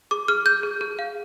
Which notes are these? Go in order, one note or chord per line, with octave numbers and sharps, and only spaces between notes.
G#4 D6
G#4 F6
G#4 G6
G#4
G#4
F5